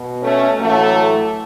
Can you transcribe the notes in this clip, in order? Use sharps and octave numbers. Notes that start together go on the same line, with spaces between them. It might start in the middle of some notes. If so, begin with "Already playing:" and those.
Already playing: B2
A3 C#4
A2 E3 F#3 A3